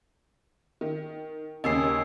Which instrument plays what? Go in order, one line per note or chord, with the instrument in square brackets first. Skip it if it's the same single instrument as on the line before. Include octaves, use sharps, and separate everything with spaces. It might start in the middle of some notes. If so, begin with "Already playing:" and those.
[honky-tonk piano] D#3
[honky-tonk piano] D#2 C#3 C#4 [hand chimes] D#5 E6 C7